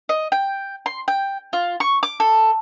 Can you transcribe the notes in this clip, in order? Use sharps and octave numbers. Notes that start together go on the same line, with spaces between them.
D#5
G5
C6
G5
F4
C#6
D6
A4